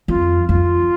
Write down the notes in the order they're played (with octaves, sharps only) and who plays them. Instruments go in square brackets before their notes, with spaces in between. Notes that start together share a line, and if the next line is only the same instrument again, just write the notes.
[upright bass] F2 [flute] F4
[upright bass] F2 [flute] F4